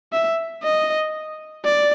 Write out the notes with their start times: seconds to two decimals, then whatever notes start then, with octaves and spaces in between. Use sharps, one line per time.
0.13 E5
0.64 D#5
1.64 D5